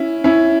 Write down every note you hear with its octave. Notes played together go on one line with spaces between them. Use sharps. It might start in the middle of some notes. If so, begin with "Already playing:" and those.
Already playing: C#4 E4
C#4 E4